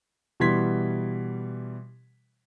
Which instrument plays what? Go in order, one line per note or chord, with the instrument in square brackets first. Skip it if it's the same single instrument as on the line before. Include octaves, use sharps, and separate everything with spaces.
[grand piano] B2 E3 G3 C6 G#6 B6